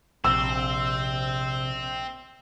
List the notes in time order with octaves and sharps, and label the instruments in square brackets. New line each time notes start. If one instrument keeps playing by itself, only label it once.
[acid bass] A#1 [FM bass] C3 [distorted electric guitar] C4 [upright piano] E6